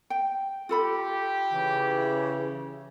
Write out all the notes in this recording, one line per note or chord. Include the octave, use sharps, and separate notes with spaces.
G5
F4 G4 A4 B5
C#3 E3